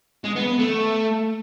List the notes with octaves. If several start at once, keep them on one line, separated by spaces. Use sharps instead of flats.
G#3
B3
B3
A3